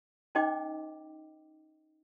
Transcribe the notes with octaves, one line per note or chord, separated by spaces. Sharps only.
C#4 D#4 C5 D#5 G5 D6